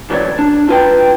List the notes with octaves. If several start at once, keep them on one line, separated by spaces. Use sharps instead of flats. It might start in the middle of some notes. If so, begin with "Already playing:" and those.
C2 F#2 E3 C#5 D5
D4
F4 B4 G5